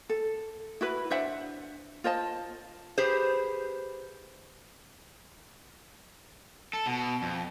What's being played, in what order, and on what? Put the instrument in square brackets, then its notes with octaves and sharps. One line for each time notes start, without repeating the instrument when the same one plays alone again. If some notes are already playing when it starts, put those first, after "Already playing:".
[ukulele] A4
E4 F#4 B4
D4 C5 E5 F#5
F4 C5 D#5 A5
[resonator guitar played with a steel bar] G4 G#4 B4 C5
[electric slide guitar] A4
B2
F2